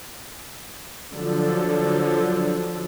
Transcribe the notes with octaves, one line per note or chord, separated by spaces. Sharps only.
D3 F3 F#3 A4